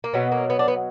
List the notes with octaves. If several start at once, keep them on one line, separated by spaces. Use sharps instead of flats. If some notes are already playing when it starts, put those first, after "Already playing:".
A#3
B2 F#3 B3
A#3
B3
D4
B3